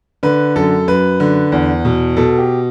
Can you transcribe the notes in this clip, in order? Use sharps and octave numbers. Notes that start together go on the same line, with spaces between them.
D3 B4
F#2 A4
F#2 B4
D3
E2
B2
B2 A4
G4